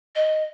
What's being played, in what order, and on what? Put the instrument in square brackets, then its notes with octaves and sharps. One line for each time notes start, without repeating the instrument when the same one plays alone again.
[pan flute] D#5